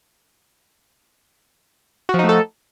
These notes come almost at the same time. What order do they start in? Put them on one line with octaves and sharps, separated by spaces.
F#4 F3 D#4 A3 A4